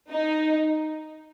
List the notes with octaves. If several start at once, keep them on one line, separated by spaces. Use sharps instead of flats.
D#4